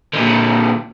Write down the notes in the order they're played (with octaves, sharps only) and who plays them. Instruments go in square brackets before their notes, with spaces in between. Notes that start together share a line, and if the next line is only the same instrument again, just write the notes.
[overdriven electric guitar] A#2 D3